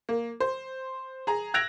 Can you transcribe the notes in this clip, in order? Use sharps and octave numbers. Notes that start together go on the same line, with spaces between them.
A#3
C5
G#4 A#5
E6 F#6 G#6 A#6 D7 F7